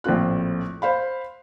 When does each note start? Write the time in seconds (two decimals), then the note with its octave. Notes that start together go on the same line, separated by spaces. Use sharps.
0.04 A#1 A2 C4 F4 F#6
0.82 C5 F5 B5